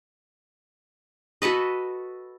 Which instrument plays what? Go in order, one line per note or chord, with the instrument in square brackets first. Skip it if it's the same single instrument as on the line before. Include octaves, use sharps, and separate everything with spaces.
[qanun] F#4 A4 B4 D#5